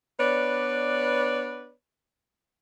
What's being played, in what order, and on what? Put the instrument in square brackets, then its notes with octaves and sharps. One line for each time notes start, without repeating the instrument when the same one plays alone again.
[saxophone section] B3 D4 B4 C#5 D5